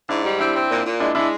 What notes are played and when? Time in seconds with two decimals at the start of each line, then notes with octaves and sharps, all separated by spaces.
0.09 G#2 D4 E4
0.24 G3 D#4
0.39 C4 D4 E4
0.55 C4
0.70 A#2
0.85 A#2
1.00 G#3 D4 E4
1.15 G#3 D4 E4